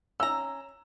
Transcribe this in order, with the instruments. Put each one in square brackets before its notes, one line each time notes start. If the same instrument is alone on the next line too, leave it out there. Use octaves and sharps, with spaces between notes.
[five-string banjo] C#4 A#5 [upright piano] E6